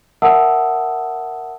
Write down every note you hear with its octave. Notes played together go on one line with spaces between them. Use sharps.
A#4 E5 F#5 A5 D#6 E6